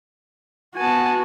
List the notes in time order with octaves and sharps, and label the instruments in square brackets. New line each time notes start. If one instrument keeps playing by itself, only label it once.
[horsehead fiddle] B3 F#4 [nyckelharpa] G#5 A5